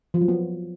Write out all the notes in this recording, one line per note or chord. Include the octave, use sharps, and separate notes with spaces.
F3
F#3
B3